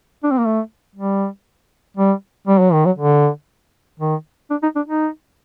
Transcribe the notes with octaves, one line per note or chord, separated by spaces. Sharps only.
D4
C4
A#3
A3
G3
G3
G3
F#3
D#3
F#3
D3
D#3
D4
D#4
D4
D#4